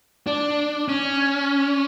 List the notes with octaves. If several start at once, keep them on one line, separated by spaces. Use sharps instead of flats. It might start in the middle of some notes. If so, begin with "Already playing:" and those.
D4
C#4